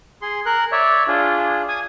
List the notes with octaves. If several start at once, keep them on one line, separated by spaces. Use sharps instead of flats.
G#4 C6
A#4 F#6
C#5 D5 E5
D4 F4 G#4
G#5 D#6